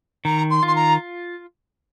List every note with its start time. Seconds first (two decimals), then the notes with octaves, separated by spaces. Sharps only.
0.25 D#3 A#5
0.50 C6
0.63 F4 C6
0.75 A#5